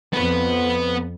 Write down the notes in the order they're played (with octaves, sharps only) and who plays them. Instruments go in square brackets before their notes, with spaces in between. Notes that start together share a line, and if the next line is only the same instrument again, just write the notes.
[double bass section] F2 [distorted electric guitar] B3 B4